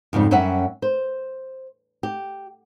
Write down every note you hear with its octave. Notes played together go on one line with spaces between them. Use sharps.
F2 G#2 C#3 G3
F#2 G3 C#4 C#5 E5 F#5
C5
G4